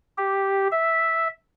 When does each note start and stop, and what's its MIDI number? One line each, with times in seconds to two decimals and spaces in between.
0.18 0.68 67
0.71 1.28 76